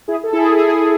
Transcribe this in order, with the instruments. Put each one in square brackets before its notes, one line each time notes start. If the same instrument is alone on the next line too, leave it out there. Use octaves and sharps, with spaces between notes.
[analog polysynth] E4 G#4
A4
E4 G#4
E4 G#4